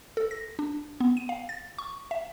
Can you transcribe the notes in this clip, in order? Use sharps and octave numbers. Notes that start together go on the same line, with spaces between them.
A4
A#6
D4
B3
D#7
F5
A6
C#6
E5